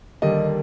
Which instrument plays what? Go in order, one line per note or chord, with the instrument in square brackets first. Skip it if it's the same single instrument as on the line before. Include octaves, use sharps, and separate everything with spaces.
[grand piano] D#2 D3 G3 A#3 D#5